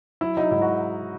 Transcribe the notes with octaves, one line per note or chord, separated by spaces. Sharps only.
F#3 E4
F#3 D#4
G#2 E4
F#4